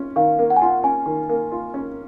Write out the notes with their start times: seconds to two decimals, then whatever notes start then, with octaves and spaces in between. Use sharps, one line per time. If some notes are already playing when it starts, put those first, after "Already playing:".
Already playing: C#4 F4
0.16 D#3 F5
0.39 A#3
0.50 F#5
0.56 G#5
0.61 F4 F#5
0.83 C#4 G#5
1.06 D#3
1.29 A#3
1.51 F4
1.74 C#4